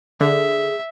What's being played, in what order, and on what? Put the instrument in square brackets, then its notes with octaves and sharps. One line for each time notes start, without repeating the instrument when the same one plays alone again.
[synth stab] D3 [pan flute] G#4 [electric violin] E5